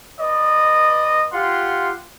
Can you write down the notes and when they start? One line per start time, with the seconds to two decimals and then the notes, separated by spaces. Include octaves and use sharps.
0.20 B4 D5 D#5
1.33 F4 G4 F#5 C6